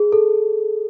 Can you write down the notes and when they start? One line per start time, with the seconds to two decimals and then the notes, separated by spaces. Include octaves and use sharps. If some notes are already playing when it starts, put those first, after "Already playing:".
Already playing: G#4
0.12 A4